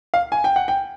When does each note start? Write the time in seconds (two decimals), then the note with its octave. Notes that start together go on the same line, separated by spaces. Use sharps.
0.14 F5
0.32 G#5
0.44 G5
0.56 F#5
0.68 G5